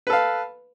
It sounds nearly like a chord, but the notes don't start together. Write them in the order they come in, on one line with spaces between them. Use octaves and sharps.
B4 A4 F5